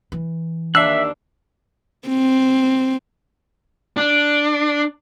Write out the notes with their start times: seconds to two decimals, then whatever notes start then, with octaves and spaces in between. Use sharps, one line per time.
0.12 E3
0.75 D#2 D4 E5 E6 F#6 C7
2.09 C4
3.97 D4